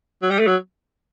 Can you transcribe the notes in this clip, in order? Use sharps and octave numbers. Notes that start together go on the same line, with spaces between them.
F#3
G3
A3
F#3